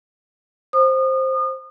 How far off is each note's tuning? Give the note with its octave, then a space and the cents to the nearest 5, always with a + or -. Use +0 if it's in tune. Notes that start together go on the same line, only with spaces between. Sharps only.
C5 +10 D#6 -35